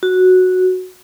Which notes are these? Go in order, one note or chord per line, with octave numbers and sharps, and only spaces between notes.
F#4